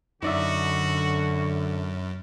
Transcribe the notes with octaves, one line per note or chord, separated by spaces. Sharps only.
F#2 D3 D#4 F#4 D5 E5